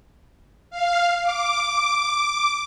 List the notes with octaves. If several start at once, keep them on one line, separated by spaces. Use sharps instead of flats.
F5
D6